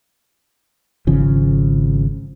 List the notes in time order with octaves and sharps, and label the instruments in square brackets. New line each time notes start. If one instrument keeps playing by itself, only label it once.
[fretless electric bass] G#1 C#3 F3